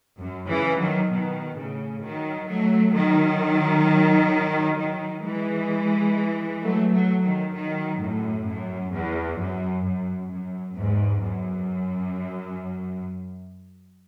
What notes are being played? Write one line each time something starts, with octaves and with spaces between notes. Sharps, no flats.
F#2
C#3 E3
D#3 F#3
B2 D#3
A2 C#3
D#3 F#3
F#3 A3
D#3 F#3
D#3 F#3
E3 G#3
F#3 A3
F#3 A3
D#3 F#3
D#3 F#3
F#2 A2
F#2
E2
F#2
F#2
F#2
E2 G#2
F#2